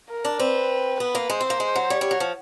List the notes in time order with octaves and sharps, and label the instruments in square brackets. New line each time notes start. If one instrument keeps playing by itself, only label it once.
[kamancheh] A#4
[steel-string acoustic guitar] D4
[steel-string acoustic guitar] C4 [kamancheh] B4
[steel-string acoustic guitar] B3 [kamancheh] B4
[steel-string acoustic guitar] A#3
[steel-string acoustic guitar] G#3 [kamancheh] C5
[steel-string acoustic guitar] C4
A#3
G#3
F#3
[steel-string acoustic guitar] G3 [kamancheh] C#5
[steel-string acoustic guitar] G3
F#3
F3